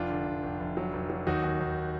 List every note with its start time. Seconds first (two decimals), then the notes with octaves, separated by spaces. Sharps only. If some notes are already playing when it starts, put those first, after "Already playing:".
Already playing: F1 D4 F4
0.10 D3
0.27 F1
0.44 F1
0.60 F1
0.77 F#3
0.93 F1
1.10 F#3
1.27 D#2 D#4 F#4
1.43 D#2
1.60 D#2